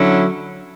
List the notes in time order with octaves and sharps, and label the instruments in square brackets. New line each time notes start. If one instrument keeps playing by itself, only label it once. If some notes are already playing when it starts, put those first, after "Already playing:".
Already playing: [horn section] D3 F#3 C#4 E4